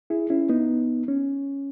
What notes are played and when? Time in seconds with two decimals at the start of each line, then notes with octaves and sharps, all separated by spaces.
0.10 E4 G#4
0.30 C#4 E4
0.49 B3 D#4
1.08 C#4